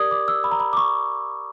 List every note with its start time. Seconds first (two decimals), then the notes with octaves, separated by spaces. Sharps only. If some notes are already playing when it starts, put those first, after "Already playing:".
Already playing: G4 A#4 D5 D#6 G#6
0.11 D6
0.28 E6
0.44 B5
0.52 A#5
0.60 B5
0.73 D6
0.77 C#6